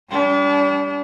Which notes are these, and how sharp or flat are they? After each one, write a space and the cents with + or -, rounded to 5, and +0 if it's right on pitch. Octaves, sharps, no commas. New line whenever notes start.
G3 +0 D4 -40